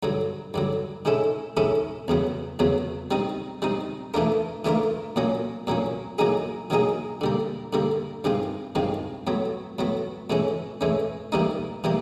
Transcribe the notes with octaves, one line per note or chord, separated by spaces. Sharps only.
G2 D3 F#3
G2 D3 F#3
D#3 G#3 C#4 E4 A4
D#3 G#3 C#4 E4 A4
E2 C#3 F#3 B3
E2 C#3 F#3 B3
G3 C4 D#4
G3 C4 D#4
E3 A3 D4 F4 A#4
E3 A3 D4 F4 A#4
A#2 F#3 A#3 C#4
A#2 F#3 A#3 C#4
D#3 F#3 A#3 D#4 G#4
D#3 F#3 A#3 D#4 G#4
D3 G3 A#3
D3 G3 A#3
G2 D#3 G#3 C4 F4
G2 D#3 G#3 C4 F4
A2 F#3 B3
A2 F#3 B3
A2 E3 G#3 C#4
A2 E3 G#3 C#4
E3 G3 A#3 D#4
E3 G3 A#3